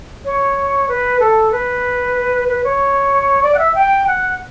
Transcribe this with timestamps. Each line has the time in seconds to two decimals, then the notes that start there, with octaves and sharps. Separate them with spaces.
0.25 C#5
0.88 B4
1.20 A4
1.52 B4
2.48 B4
2.64 C#5
3.43 D5
3.55 F#5
3.59 E5
3.75 G5
4.07 F#5